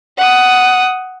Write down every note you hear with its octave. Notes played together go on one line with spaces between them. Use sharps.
F#5 D#6